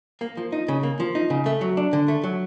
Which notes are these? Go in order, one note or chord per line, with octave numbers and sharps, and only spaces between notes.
A#3
F3
D#4
C#3
A#3
F3
D#4
C#3
A3
F#3
D4
D3
A3
F#3